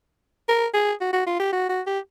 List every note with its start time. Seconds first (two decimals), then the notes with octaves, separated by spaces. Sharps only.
0.49 A#4
0.74 G#4
1.01 F#4
1.13 F#4
1.27 F4
1.40 G4
1.53 F#4
1.69 F#4
1.87 G4